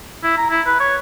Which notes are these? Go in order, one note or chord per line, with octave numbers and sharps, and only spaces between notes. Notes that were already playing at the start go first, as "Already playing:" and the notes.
E4
A#5
E4
B4
C#5